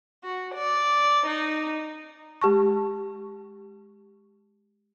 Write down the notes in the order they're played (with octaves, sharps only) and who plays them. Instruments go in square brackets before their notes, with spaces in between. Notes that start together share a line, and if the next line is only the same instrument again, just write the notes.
[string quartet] F#4
D5
D#4
[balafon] G#3 G4 A5 C#6